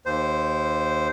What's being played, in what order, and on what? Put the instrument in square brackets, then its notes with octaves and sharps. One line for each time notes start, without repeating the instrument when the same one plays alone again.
[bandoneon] D#2 C5